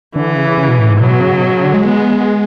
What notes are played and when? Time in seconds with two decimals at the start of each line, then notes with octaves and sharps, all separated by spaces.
0.16 D3 E3
0.36 C#3
0.58 C#3
0.69 B2
0.79 A2
0.90 G#2
1.00 B2 F#3
1.21 C#3
1.42 B2
1.52 C#3
1.63 D3
1.74 G#3
1.84 B3